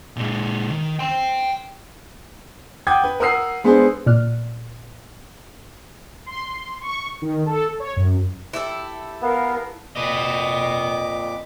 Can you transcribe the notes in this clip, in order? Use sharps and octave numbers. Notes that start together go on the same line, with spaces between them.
A#2 G#3
D#3
G5 C6
F#5 G5 D6 D#6 G6 G#6
B4
A#4 F#5 D#6 E6 C7
G#3 B3 D4 G#4 C5
A#2 D5 F6 F#6
C6
C#6
D#3
A4
C#5
F#2
E4 G4 A4
B3 A#4 F5
F2 A#2 B4 D#5 D6